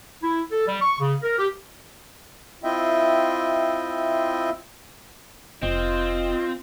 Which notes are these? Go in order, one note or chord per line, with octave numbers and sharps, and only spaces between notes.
E4
A4
G3
C#6
C#3
A#4
G4
C4 E4 F4 D#5 E5 G5
F1 C4 F4 D#5